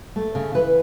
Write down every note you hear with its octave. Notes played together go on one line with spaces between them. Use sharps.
A3
C#3
E3 B4